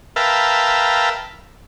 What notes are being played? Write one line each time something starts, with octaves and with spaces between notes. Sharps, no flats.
A#4 B4 E5 F5 G5 A5